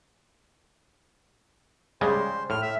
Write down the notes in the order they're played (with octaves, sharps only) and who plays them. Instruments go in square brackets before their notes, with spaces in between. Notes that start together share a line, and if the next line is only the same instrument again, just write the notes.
[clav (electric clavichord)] C#3 G3 G#3 [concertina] C5
[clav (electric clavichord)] A2 [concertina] F6
[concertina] E5